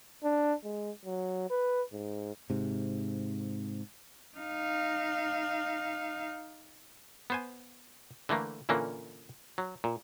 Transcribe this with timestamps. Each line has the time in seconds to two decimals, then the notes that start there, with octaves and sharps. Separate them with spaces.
0.24 D4
0.64 G#3
1.05 F#3
1.50 B4
1.92 G#2
2.50 G#2 C3
4.38 D#4 F5
7.30 B3 C5 G#5
8.29 D3 E3 A3 A#3
8.69 A#2 D3 E3 A#3 C#4
9.58 F#3
9.84 A#2